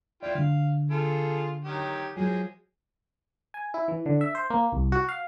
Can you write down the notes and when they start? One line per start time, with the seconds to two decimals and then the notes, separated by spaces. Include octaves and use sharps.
0.23 E4 F4 D5 G5
0.35 D3 F5
0.91 F4 G#4 A4
1.65 D#3 F#3 G4
2.16 F3 F#3 G#3 G#4
3.54 G#5
3.74 E4
3.88 E3
4.06 D3
4.21 E5
4.35 C5
4.50 A#3
4.72 C2
4.92 F#4
5.09 F5